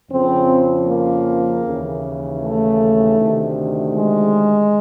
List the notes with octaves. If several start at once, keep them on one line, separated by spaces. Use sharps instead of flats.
F2 C#3 F3 C4
A#3
D#2 C#3 E3
A3
D2 C3 D#3
G#3